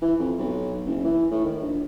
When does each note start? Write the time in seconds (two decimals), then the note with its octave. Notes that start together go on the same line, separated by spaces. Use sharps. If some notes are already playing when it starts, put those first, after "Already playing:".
0.02 E3
0.19 F2
0.39 B1
0.86 F#1
1.04 E3
1.31 A2
1.45 D#3
1.62 A#1